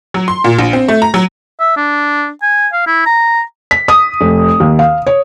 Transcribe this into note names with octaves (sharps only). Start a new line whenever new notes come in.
F#3
C6
A#2
A#1
C4
A3
A#5
F#3
E5
D4
G#5
F5
E4
A#5
B6
D#6
F1
D#2
F5
C#5